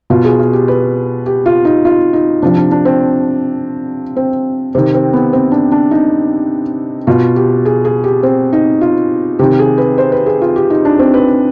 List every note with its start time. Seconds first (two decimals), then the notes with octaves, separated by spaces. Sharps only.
0.10 B2 F4
0.25 G#4
0.39 F4
0.53 G4
0.68 B4
1.26 G4
1.46 F4
1.65 D#4
1.85 F4
2.13 D#4
2.42 C3 F3 D4
2.57 D4
2.72 D4
2.85 C4
4.16 C4
4.75 C3 D#3 C4
4.94 C4
5.13 B3
5.33 C4
5.52 D4
5.72 D4
5.91 D#4
7.07 B2 F4
7.36 G4
7.65 G#4
7.85 G#4
8.04 G4
8.23 C4
8.53 D#4
8.81 F4
9.39 C3 D#3 G4
9.59 G#4
9.78 B4
9.98 C5
10.12 B4
10.26 G#4
10.41 F4
10.56 G4
10.70 D#4
10.85 D4
10.99 C4
11.14 B4